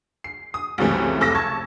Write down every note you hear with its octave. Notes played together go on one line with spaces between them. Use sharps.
C7
D#6
C#2 F#2 C3 E3 A3
F1 A4 D6 E6 A#6
A5 C#6 G#6